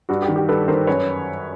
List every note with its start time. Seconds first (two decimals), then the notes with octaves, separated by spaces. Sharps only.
0.09 G2 F#4
0.22 G4
0.28 D#3
0.36 G4
0.49 G2 A4 B4
0.68 D#3 A#4 C5
0.87 F#2 B4 C#5